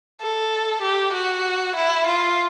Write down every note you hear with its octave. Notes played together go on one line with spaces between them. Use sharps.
A4
G4
F#4
E4
F4